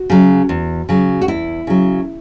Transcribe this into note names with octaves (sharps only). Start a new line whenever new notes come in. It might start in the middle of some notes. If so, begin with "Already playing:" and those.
Already playing: F#4
C#3 F#3
E2
C#3 F#3
F#4
E2 E4
C#3 F#3